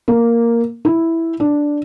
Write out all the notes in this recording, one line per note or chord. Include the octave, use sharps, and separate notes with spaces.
A#3
E4
D4